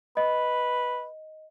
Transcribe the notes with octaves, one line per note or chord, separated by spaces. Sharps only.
B4 D#5